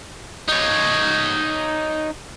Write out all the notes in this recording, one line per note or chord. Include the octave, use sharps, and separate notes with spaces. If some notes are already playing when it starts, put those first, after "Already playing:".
D#4 C#5